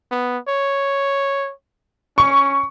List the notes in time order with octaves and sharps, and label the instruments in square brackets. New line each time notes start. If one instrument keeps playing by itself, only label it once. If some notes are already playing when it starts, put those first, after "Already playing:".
[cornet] B3
C#5
[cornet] C#4 [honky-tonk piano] C#6